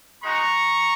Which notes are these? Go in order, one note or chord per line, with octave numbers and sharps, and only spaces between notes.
G#3 D#4 F#4 A#5 C#6